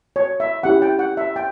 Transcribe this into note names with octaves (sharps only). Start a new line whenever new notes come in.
C#5
E5
C#4 E4 G4 F#5
G5
F#5
E5
G5